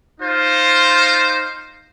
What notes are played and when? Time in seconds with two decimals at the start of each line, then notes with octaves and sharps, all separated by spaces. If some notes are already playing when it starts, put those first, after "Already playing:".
0.21 D#4 F4 C5